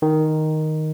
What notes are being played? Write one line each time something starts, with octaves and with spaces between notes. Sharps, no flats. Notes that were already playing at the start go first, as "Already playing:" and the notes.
D#3